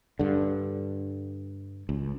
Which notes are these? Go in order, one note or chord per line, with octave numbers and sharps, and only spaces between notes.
G2 D3
C#2